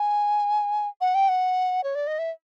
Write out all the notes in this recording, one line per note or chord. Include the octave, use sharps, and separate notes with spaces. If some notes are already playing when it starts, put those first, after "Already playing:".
Already playing: G#5
F#5
G5
F#5
C#5
D5
D#5
E5